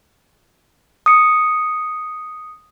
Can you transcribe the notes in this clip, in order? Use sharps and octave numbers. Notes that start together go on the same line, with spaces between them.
D#6 C#7